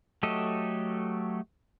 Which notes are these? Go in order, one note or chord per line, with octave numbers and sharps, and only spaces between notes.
F#3 A3 G4 A4 D#5